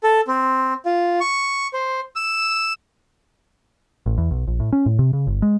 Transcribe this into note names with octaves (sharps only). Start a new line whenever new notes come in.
A4
C4
F4
C#6
C5
E6
A1
E2
B1
A#1
A2
C#4
A2
C3
C#3
G1
G#3